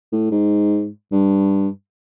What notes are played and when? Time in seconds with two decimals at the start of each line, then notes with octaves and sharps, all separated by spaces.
0.12 A2
0.31 G#2
1.12 G2